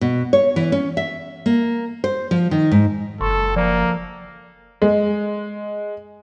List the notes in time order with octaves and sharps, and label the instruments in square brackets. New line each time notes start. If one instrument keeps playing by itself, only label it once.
[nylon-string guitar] B2
C#5
E3
C#4
E5
A#3
C5
F3
D#3
G#2
[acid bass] F#1 [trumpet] A4 [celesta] C6 C#6
[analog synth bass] F3 [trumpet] A#3 [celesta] D5 A#5
[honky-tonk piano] G#3